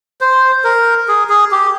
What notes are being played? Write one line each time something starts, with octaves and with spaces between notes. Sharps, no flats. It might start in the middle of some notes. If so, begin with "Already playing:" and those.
C5
A#4
G#4
G#4
G4